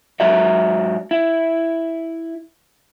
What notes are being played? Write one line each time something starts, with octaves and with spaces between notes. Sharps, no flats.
G#2 F#3 F#4 D5 E5
E4